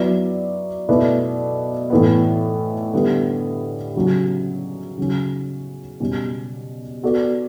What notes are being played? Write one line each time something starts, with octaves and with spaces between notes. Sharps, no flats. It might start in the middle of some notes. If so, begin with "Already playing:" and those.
Already playing: F#3 B3 E4 B4 D5
B2 A3 E4 B4 D5
A2 E3 B3
D3 G3 B3 E4
C#3 F#3 C#4
C#3 F#3 C#4
B2 G3 C#4
B3 F#4 A4 D5